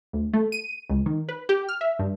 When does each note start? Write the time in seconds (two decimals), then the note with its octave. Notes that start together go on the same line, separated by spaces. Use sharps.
0.13 D2
0.33 A3
0.52 D#7
0.90 C#2
1.06 D#3
1.29 B4
1.49 G4
1.69 F6
1.81 E5
1.99 G2